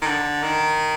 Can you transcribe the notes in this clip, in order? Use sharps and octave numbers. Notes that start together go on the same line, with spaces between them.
D#3
D3
D#3